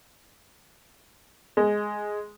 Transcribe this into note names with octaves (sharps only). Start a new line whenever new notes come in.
G#3